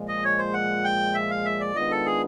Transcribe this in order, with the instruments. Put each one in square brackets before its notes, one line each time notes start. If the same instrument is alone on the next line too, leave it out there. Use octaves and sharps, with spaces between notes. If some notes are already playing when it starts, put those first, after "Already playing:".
Already playing: [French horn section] A#2 F3 G#3
[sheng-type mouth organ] D#5
C#5
C5
F#5
G5
E5
F5
E5
D5
[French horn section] D#3 G#3 B3 D4 F4 [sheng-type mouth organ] D#5
[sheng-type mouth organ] A4
G#4